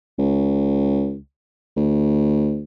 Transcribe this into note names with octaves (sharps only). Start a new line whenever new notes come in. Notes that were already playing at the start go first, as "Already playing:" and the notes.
C#2
D2